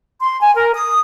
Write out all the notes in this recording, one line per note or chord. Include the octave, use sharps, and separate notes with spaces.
C6
G#5
A#4
D#6